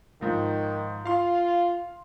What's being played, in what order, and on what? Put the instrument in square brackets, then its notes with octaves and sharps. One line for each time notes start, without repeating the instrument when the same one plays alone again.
[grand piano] G#2 F3 [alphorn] D#3
[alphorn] F4 [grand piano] F5 C6